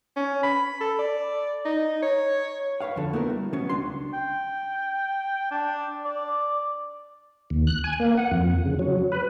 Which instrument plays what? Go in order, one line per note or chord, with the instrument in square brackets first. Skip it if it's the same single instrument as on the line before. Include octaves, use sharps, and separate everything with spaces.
[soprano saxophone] C#4
B5
A4
D5
D#4
C#5
[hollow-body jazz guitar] B4 C#5 F5 F#5
F2 D3 A4
A3 B3 E4 F#4 G#4 A#4
G3
B2 F#3 B3 C#4
C#2 D4 C6
[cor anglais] G5
D4
D5
[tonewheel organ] D#2
F#6
G#5
A#3
F#5
F2
C#3
F#3
B4